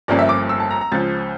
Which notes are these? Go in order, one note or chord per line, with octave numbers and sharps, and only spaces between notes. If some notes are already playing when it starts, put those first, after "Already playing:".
G1 G2 F3 A#3 C#4 D5
E5
D6
E6
A5
A#5
A#5
C#2 C#3 F3 A6